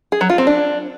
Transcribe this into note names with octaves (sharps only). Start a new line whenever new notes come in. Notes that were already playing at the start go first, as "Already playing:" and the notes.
G#4
F#3
F4
C4
D4